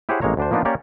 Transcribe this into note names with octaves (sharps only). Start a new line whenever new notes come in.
E4 G4 G#4 C5 C#5 F#5
A1 G#3 A#3 C#5 A#5
D2 D4 C5
F3 A#3 B3 D4 D#4 F4
A#3 C#4 G4 A#4 C#5 D5